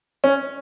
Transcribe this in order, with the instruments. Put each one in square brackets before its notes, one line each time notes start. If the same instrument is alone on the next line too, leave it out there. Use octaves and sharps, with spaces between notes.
[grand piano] C#4